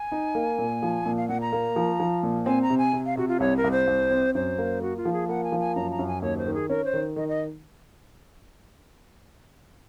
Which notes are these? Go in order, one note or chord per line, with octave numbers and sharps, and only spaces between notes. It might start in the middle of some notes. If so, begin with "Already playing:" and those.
Already playing: G#5
D#4
A#3
A#2
F3
A#2
F5
A#2 F#5
A#5
A#3
F3
F3
A#2
C4 G#5
A#5
C3
G#5
C3
F5
C3 F#4
F4
C2 C#5
A#4
C2
C5
C2
C4
F#2 C5
A#3
A#3 F#4
F4
F3
G#4
A#3 F#5
G#5
F3
G#5
F#2 A#5
A#5
F#2
G#5
D#2 C#5
C5
D#3
G#4
C#4 A#4
C5
D#3
D#3 D#5
D#5